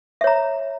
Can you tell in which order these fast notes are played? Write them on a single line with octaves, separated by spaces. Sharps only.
E5 C#5 A#5